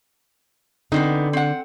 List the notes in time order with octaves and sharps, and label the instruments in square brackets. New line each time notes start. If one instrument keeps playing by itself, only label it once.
[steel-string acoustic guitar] D3 [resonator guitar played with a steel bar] B3 C4 D#4
[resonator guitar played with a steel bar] C4 F#5